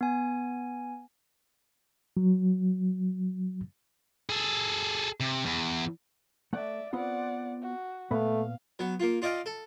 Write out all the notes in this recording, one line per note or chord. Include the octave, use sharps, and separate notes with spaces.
B3 G#5
F#3
G#4 A4
C3
E2
A3 D5 E5 F#5
B3 C4 F4 D5 F#5
F#4
A#2 A3 B3 F5 B5
F#3 B3
A#3 F4
F4 D5 D#5 F5 G5
A4